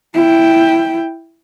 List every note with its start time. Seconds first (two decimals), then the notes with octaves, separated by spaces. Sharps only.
0.15 E4 G5